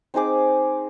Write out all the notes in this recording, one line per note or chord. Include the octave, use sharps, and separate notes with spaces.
C4 D#4 G#4 D6